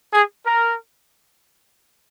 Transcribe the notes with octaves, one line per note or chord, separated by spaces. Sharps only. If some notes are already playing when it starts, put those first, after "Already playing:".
G#4
A#4